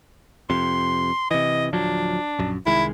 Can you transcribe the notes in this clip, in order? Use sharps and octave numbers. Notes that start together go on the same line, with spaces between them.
F2 C3 C6
C3 E3 D#5
D1 F3 F#3 D4
A#1 F#2
C2 D#3 G#3 E4